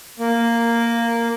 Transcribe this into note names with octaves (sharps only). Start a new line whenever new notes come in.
A#3